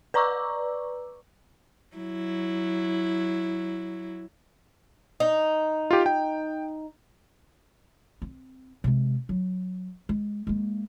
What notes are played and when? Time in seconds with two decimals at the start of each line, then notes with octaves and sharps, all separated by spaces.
0.14 B4 D5 A#5 C#6 D6 E6
1.97 F#3 E4
5.20 D#4
5.91 F4 G4
6.06 G5
8.22 C4
8.84 C3 G#3
9.29 F#3
10.09 G#3
10.47 G#3 A#3